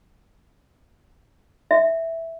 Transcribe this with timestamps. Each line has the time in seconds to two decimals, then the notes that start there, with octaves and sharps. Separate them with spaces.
1.71 E5